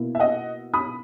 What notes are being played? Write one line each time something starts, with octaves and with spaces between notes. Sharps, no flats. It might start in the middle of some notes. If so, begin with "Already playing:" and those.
Already playing: B2 A#3 E4
E5
D#5 F#5
B5 D#6